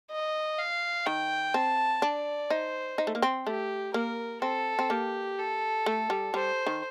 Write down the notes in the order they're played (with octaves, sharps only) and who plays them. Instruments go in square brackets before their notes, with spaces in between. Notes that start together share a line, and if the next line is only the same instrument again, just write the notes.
[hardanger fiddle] D#5
F5
[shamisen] D#3 [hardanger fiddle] G5
[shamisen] C4 [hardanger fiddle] A5
[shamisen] D4 [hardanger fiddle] D5
[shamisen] D#4 [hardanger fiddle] C5
[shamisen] D#4
A3
A#3
C4
[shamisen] A3 [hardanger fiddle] G4
[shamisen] A#3 [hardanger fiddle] A#4
[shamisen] C4 [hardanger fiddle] A4
[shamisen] C4
[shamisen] A#3 [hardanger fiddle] G4
[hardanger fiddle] A4
[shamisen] A3
G3
[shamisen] G3 [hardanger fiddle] C5
[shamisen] D#3